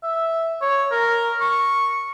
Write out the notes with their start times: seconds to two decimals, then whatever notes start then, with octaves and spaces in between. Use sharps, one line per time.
0.04 E5
0.62 C#5
0.92 A#4
1.41 C#6